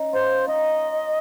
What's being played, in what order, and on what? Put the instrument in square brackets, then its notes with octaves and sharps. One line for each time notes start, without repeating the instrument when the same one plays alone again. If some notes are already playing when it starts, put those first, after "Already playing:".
Already playing: [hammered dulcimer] C#4 D#4
[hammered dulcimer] F4 [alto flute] C5
[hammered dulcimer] D#4 [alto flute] D#5